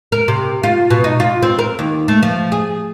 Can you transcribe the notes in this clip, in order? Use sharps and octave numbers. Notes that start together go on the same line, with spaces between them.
A#4
C3
F4
B2
D#4
F4
C4
A#4
D#2
A3
F3
G#4